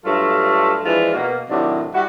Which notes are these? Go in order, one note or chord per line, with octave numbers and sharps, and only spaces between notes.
G2 F#3 A3 F4 A4
E3 F3 G#3 D4 F4
B2 A#3
A2 C3 D#3 F#3 D4
G3 E4 F#4